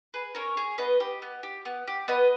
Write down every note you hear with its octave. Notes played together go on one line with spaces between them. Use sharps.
G#4 B4
C#4 A#4 C#5
G#4
B3 B4 D#5
G4
B3
G4
B3
G4
B3 B4 D#5